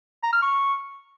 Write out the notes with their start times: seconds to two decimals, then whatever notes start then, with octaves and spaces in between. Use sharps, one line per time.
0.23 A#5
0.33 F6
0.42 C#6